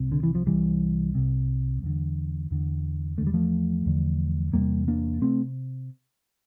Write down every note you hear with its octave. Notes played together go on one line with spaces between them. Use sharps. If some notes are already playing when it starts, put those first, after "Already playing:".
Already playing: C2 C3
D3
E3
F3
C2 C3 E3 G3
C2 C3
E2 D3
E2 D3
E2 D3 A3
G3
F3 A3
E2 D3
E2 C3 G3 A#3
A#3 D4
C3 A3 C4